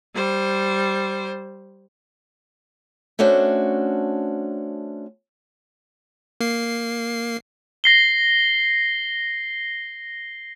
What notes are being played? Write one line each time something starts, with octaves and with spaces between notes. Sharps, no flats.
G3 C5
A3 C#4 D4 F#4 C5
A#3 C7
A#6 C7 G7